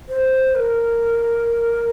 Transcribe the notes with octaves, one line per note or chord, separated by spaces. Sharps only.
C5
A#4